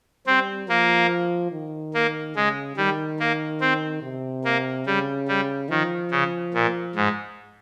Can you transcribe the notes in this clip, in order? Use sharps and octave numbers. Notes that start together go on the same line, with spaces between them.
G3 C4
F3 A#3
D#3
A#3
C#3 G#3
D#3 G3
A#3
C4
C3
A#3
C#3 G3
G3
D#3 F3
C#3
A#2
G#2